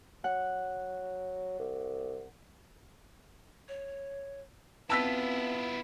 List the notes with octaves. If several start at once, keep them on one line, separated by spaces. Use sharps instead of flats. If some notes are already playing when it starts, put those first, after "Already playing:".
F#3 F#5
C2
C#5
B3 C4 E4 F4 A5 E6 B6